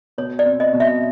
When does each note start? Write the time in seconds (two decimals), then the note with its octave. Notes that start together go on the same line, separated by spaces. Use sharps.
0.18 B2 C#5
0.39 D5
0.46 C4
0.60 D#5
0.73 B2
0.80 E5